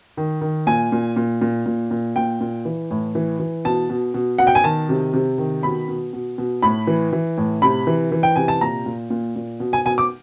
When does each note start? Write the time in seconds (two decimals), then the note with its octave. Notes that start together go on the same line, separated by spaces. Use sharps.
0.17 D#3
0.41 D#3
0.67 A#2 G#5
0.92 A#2
1.16 A#2
1.41 A#2
1.66 A#2
1.91 A#2
2.16 A#2 G5
2.41 A#2
2.65 E3
2.91 A2
3.15 E3
3.40 E3
3.65 B2 A5
3.90 B2
4.14 B2
4.38 B2 F#5
4.47 G5
4.55 G#5
4.63 D#3 A5
4.89 C3
5.13 C3
5.38 D#3
5.63 B2 B5
5.88 B2
6.13 B2
6.38 B2
6.62 A2 B5
6.87 E3
7.13 E3
7.38 A2
7.62 C3 B5
7.87 E3
8.12 E3
8.23 G5
8.36 C3 G#5
8.48 A5
8.61 A#2 A#5
8.86 A#2
9.10 A#2
9.36 A#2
9.60 B2
9.73 G#5
9.85 B2 G#5
9.98 D6